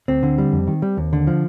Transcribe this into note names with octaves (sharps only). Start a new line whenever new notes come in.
D2 C4
D3
G3
F2
D#3
G3
D#2
D3
F3